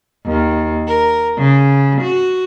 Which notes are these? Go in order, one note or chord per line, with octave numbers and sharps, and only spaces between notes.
D#2
A#4
C#3
F#4